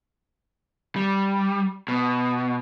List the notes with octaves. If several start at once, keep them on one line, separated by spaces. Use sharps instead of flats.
G3
B2